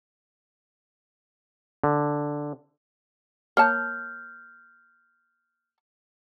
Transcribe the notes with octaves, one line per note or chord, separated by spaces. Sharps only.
D3
A#3 C#5 A5 F6 G6